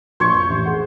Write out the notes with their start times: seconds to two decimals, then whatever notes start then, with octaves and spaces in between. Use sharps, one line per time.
0.20 A#1 F3 C5 C#5 C#6 G#6
0.34 F2 C5
0.50 A1
0.66 G#4 F#5